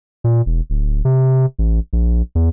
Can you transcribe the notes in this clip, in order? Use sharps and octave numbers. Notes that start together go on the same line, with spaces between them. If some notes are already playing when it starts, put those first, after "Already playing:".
A#2
E1
D1
C3
A1
A#1
E2